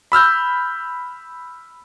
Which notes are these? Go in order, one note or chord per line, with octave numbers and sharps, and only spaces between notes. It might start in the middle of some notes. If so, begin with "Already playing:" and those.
B5 E6 F6 G6